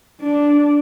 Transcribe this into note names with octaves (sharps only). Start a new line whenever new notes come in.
D4